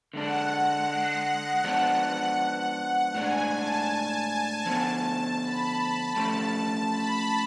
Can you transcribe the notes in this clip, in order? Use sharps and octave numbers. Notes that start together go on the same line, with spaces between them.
D3 G#3 D4 F#5
F3 G#3 B3 D4
F#5
A2 G#3 D4 G#5
A5
D3 F3 B3
B5
F3 A3 C#4 A5
B5